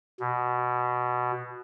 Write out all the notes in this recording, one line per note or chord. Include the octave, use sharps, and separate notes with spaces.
B2